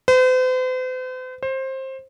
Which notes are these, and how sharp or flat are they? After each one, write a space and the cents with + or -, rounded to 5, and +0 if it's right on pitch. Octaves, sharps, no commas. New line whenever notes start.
C5 -45
C5 +20